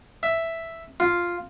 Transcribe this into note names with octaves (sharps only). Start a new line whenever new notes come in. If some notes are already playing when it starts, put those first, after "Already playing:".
E5
F4